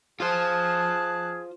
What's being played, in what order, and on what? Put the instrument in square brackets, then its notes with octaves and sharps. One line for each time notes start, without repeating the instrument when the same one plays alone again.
[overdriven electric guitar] F4 C5 [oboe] G#4 [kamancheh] A5 F#6